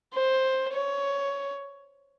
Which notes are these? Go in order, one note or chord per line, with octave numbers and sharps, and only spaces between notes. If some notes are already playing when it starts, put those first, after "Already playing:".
C5
C#5